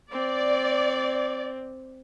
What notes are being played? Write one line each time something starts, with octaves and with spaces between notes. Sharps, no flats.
C4 D5